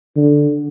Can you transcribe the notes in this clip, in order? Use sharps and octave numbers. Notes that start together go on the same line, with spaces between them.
D3